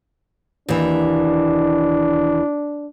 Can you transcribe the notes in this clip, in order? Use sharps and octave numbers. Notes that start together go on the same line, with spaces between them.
D#2 E3 D4